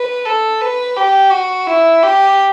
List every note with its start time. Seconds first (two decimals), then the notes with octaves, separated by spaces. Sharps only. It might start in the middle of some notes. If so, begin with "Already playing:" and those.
Already playing: B4
0.25 A4
0.61 B4
0.96 G4
1.32 F#4
1.67 E4
2.03 G4